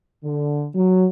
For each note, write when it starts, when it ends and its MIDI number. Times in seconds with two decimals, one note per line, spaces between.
0.24 0.67 50
0.75 1.08 54